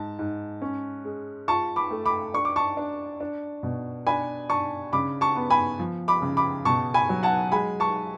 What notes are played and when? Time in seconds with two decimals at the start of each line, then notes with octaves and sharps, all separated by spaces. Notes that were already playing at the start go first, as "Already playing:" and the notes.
Already playing: G#2 A5
0.19 G#2
0.62 C#4
1.05 G#3
1.48 F4 A5 C#6
1.76 B5 D6
1.91 A3
2.05 B5 D6
2.34 D4 C#6
2.45 D6
2.56 A5 C#6
2.77 D4
3.20 D4
3.63 B2
4.07 D4 G#5 B5
4.50 D4 A5 C#6
4.93 C#3 B5 D6
5.21 A5 C#6
5.36 B3
5.50 G#5 B5
5.79 F3
6.08 B5 D6
6.22 C#3
6.37 B5 D6
6.65 B2 A5 C#6
6.94 G#5 B5
7.09 F#3
7.23 F#5 A5
7.52 G#3 G#5 B5
7.80 A5 C#6